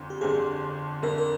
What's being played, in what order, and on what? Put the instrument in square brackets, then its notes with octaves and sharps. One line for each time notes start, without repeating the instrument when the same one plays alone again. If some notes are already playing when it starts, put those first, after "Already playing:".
Already playing: [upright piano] G1 F2 D3
[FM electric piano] G4
[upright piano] G1 F2 D3 [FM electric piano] G#4
[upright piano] G1 F2 D3 [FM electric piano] A#4
[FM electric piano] A#4